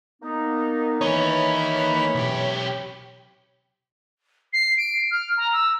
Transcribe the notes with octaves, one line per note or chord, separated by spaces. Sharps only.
A#3 B3 D#4
E3 A#3 D#4 C#5 B5
B1 G4
C7
D7
F6
A#5
E6